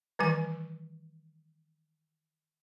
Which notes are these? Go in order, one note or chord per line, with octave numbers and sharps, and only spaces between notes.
D#3 E3 G3 G#5